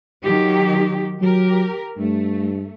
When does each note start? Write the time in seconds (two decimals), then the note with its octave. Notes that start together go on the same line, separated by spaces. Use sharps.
0.22 D#3 F#3 G4
1.21 F#3 G4 A#4
1.98 G2 A3